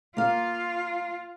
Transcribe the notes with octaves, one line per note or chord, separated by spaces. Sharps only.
A#3 F4 F5